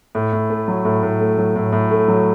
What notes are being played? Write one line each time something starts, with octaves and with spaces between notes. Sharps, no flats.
A2
A2
A3
F#3
A2
A2
A3
F#3
A2
A2
A3
F#3